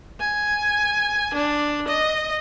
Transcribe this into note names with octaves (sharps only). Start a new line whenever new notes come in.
G#5
D4
D#5